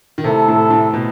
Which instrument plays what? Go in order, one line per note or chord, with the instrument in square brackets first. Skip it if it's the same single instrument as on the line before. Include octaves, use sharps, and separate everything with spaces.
[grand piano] D#3
[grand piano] C3 [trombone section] A3 E4 A4
[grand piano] A2
A2
B2